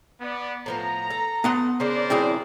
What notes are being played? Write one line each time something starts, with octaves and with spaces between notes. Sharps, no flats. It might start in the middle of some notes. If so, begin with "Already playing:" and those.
B3 D5
A2 F3 B3 A#5
A4
B3 F#5 C6
C#3 D4 A#4 C5 D5
C4 E4 G#4